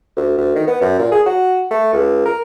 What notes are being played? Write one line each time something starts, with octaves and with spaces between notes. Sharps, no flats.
D2
D2
D#3
B3
F#2
A#2
G#4
F#4
A3
C#2
A#4